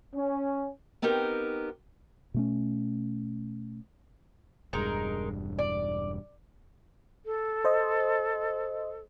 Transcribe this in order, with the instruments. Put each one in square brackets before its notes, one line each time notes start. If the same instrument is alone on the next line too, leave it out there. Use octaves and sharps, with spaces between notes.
[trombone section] C#4
[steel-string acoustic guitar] B3 C4 D#4 G4 A#4
[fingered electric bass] B2 A3 C#4
[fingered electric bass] E1 G2 [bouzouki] G#3 D#4 A#4
[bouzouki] D5
[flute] A4
[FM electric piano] C5 D#5